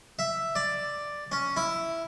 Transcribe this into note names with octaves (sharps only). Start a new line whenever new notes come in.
E5
D5
C#4
E4